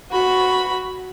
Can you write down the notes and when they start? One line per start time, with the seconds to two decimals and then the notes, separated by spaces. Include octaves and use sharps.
0.11 F#4 B5